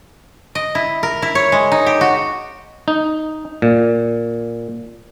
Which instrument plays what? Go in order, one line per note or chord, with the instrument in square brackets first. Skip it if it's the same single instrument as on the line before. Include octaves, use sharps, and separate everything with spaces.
[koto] D#5
E4
A#4
E4
C#5
G#3
D#4
G4
F#4
[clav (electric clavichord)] D#4
A#2